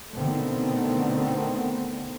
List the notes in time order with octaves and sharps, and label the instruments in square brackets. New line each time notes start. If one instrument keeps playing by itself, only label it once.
[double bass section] B2 D3 D#3 A3 B3 C4